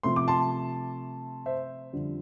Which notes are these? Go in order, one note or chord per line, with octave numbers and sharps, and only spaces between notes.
C3 F3 A3 C6
D6
A5 C6
C5 E5
F2 D3 G3 D4